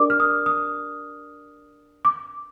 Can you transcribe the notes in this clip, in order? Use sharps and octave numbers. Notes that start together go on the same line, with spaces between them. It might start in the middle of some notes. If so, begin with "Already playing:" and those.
Already playing: D4 G4 A#4 D5 D6
F6
D#6
D#6
D6